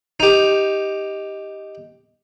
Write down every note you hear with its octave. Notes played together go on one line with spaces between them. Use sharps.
D#4 G4